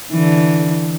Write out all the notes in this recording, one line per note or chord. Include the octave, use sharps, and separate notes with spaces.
D3 E3